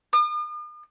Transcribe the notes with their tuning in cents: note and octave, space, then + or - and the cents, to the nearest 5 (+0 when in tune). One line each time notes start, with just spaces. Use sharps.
D#6 -45